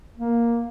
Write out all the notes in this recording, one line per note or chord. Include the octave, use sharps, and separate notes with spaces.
A#3